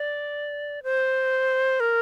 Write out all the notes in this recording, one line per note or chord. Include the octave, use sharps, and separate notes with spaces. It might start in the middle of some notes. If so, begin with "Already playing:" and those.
Already playing: D5
C5
A#4